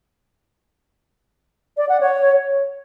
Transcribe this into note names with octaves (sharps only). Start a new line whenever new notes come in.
D5
F#5
C#5